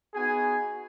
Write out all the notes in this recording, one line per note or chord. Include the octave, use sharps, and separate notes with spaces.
B3 D#4 F#4 G#4 G#5